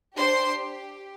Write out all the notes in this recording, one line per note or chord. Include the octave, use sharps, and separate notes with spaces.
D4 G4 C5 C6